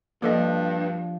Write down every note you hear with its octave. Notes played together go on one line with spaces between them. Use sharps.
G2 F3 A#3 D4 A4 D#5